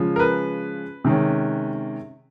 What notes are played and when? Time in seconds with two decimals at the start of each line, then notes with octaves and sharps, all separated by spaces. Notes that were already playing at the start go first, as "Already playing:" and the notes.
Already playing: C#3 F3 G#3
0.16 A#4
0.19 B4
1.05 C3 D#3 G#3 C#4